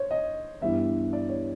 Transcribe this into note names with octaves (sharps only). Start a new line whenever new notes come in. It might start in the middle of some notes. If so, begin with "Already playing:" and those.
Already playing: C5 C#5
D#5
G2 E3 G3 B3 E5
D5
C#5